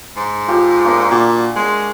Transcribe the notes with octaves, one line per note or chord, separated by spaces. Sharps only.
G#2
F4 G4 A4
A#3 D4 D5
A#2 F#4
G#3 C6